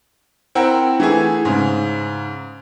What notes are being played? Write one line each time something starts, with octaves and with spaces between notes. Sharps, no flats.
C4 E4 A#4 F#5 G5
E3 A3 E4 G#4
G#2 C#3